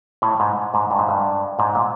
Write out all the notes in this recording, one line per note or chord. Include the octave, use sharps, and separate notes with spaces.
A2
G#2
G#2
G2
G#2
G2
G#2
A#2